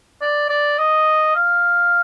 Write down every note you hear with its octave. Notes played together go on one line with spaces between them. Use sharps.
D5
D5
D#5
F5